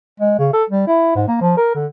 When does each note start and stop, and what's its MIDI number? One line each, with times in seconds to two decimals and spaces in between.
0.20 0.37 56
0.39 0.49 49
0.53 0.63 69
0.70 0.85 55
0.87 1.15 64
1.15 1.23 44
1.28 1.37 58
1.41 1.55 53
1.57 1.70 70
1.74 1.86 50